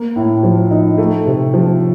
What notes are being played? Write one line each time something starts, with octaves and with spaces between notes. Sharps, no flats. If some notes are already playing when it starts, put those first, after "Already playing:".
Already playing: A#3
A2
F3
D#4
A3
C3
F3